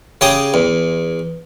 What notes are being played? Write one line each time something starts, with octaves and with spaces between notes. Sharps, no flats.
C#3 G4 G#4 G5 D#6
E2